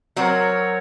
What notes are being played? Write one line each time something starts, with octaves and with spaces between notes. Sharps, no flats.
F#3 C4 F#4 A#4 C#5